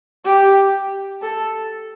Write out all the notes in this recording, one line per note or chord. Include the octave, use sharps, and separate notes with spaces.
G4
A4